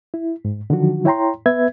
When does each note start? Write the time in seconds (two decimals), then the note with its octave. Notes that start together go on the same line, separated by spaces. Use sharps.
0.14 E4
0.45 G#2
0.70 D3 D#3 F3 F#3 F#4
1.05 E4 C#5 G5 A#5 C6
1.46 B3 B4 E5 G#6